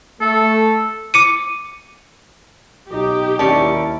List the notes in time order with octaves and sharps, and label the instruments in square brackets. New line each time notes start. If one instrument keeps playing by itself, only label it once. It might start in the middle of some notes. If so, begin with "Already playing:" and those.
[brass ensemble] A3 [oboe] A4
[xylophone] D6 C#7 D#7
[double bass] B1 D#4 [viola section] G4
[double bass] D#2 E4 [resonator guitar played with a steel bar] C#4 A#4 D5 [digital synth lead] A5